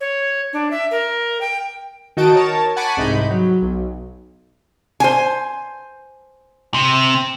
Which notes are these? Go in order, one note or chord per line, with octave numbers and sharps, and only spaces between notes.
C#5
D4
E5
A#4
G5
D#3 D#4 F#4 D#5 A5 D7
A#4 C#5 A5
F#5 G#5 A5 B5 C#6 D6
C2 G#2 C3 D#4 B5 G6
F#3
B1
C5 G#5
C3